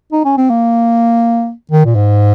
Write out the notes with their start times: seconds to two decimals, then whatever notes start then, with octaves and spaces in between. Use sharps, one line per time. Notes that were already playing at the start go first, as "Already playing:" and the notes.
0.12 D#4
0.25 C#4
0.37 C4
0.50 A#3
1.71 D#3
1.85 A#2
1.95 G#2